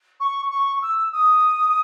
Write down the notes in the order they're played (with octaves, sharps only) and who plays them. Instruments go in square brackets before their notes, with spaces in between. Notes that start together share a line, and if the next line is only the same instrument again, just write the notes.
[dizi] C#6
C#6
E6
D#6